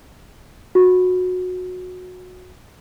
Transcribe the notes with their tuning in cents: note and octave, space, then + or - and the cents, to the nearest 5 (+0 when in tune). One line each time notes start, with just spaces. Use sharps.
F#4 -20